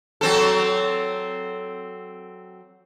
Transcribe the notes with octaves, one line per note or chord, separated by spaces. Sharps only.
F#3 C4 A4